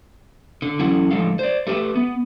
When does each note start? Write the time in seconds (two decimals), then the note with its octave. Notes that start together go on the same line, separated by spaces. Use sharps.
0.62 D3
0.79 E2 F#3 C#4 E4 A4 F#5
1.11 A2 D3 F3 G#3 A4 F5
1.39 C5 D5
1.67 A3 G4 B4 E5
1.96 B3